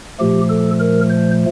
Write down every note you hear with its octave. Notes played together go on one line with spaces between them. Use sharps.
A#2 F3 A3 G4
A4
A#4
C5